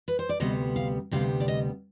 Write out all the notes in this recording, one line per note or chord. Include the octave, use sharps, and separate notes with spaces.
B4
C5
D5
D2 C3 G3 B3 D#5
F5
D2 C3 G3 B3 F5
D5
D#5